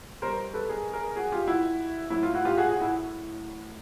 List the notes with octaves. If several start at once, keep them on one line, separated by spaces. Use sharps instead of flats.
B2 G3 A#4 C5
A4 B4
G#4 A#4
G#4 A#4
F#4 G#4
F4 G4
E4 F#4
A2 F#3 E4
F4
E4 F#4
F4 G4
F#4 G#4
F#4 G#4
E4 F#4